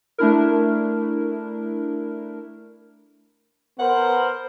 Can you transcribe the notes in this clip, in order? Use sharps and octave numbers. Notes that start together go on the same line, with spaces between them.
A3 D4 E4 A#4
B3 A#4 C5 F#5